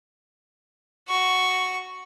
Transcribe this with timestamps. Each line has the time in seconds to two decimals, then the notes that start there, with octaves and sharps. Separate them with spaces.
1.09 F#4 C#6